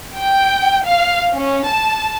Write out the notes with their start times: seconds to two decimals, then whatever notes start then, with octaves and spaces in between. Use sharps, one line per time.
0.17 G5
0.86 F5
1.35 C#4
1.66 A5